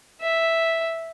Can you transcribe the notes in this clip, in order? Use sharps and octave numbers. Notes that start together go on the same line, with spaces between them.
E5